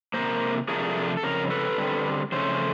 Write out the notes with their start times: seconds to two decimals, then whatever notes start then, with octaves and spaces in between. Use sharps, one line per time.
0.14 F3 A#3 A#4 C5
0.18 C3
0.68 C3 F3 A3 D4 G#4 A#4
1.17 A4
1.23 F2 C#3 A#4
1.50 A4 B4
1.78 D3 G3 C4
2.32 F2 C#3 A3 C#4 C5